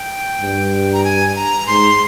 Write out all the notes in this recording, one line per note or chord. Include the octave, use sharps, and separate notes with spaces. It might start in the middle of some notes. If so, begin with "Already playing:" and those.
Already playing: G5
G2
A#5
G#5
A#5
G#2 C6